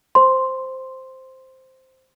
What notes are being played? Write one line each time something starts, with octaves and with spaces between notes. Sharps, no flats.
C5 C6